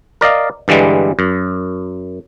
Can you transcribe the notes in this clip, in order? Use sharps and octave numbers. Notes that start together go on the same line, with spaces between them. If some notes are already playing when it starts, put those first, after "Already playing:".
A#4 D5 D#5 F5
G2 D3 E3 G3 G#3
F#2